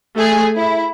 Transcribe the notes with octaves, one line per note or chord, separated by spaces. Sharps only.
A3 G#4
E4